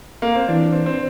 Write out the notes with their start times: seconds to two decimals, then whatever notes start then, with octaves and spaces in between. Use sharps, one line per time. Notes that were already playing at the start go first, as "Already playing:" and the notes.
0.22 A#3
0.35 C4
0.48 E3 D4
0.72 C4
0.86 C4